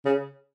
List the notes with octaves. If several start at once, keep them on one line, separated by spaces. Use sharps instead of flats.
C#3